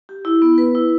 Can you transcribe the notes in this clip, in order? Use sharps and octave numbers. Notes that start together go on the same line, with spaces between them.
G4
E4
B3
B4
E4